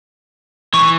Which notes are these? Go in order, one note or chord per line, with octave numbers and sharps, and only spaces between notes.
E3 C#6